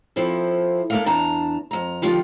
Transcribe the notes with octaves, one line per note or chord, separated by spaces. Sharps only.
F3 C4 E4 A4
A#3 D4 A4 A#4 E5 F5
E2 D4 A5 A#5
F2 A#5
D3 D#3 F3 D4 F4 G4